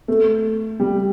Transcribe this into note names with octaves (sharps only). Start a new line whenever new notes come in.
A3
G3